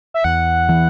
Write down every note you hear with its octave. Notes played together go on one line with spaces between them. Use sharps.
E5
E2 F#5
E3